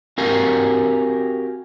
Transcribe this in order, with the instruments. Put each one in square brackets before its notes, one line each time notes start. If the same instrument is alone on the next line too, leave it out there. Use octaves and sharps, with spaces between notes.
[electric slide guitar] C4 F#4 G4 A#4 F5 G#5